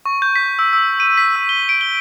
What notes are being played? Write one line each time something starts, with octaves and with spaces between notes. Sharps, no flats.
C#6
G6
B6
E6
E6
D#7
B6
E6
G7
D7
G7